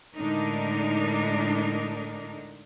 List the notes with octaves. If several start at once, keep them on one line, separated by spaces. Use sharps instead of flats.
A2 D3 G#3 D4 D#4 A#4